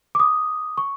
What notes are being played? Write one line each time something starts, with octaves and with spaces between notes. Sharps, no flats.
D6
D#6
C#6